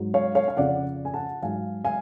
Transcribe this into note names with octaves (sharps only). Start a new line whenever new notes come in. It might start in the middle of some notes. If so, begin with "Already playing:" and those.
Already playing: G#2 F#3
C#5 F5
C#5 F5
F5
F2 C#3 F3 D5 F#5
G#5
F#5 A5
G#2 F#3 F5 G#5
F5 G#5